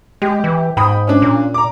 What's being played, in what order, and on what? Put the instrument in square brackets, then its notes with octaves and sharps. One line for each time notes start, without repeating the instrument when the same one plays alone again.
[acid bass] G#3 [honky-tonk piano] G4
[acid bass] E3
[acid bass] G#2 [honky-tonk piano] G5 B5 D#6
[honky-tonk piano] C#4 D4
[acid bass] A#2
[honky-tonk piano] A#5 D6